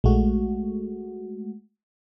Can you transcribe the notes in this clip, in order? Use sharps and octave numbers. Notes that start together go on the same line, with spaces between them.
A#1 G#3 A3 F#4